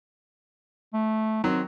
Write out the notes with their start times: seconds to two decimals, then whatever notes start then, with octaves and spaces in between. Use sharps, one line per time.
0.94 A3
1.44 D#3 F#3 C4